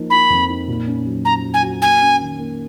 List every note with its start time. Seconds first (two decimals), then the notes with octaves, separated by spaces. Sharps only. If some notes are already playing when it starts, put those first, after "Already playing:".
Already playing: F3 A#3 D#4
0.10 D#4 B5
0.30 F2
0.49 D#4
0.68 A#2
0.87 C#4
1.06 F#3
1.24 C#4 A#5
1.44 F#3
1.54 G#5
1.63 F#4
1.82 A#3 G#5
2.01 C#4
2.21 D#3
2.39 A#3